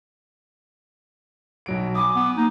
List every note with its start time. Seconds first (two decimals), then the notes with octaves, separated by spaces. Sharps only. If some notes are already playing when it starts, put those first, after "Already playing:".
1.66 B1 F#3 D7
1.95 G#5 B5 D6 D#6
2.16 B3
2.37 A#3 D#4